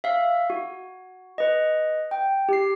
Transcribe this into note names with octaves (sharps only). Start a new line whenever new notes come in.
E5 F5
F#4
B4 D#5
G5
G4 C7